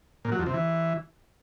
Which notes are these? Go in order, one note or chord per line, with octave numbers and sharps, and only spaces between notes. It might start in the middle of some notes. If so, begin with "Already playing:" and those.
A#2
F#3
F2
C3
E3